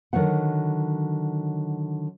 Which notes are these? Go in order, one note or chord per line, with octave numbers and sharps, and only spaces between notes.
D3 D#3 F#3 C4 F#5